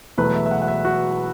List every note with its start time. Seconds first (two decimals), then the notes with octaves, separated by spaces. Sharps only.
0.18 E1 E2 B2 F#3 A3 B4
0.35 E5
0.46 E5
0.51 F#5
0.62 F#5
0.68 E5
0.85 F#4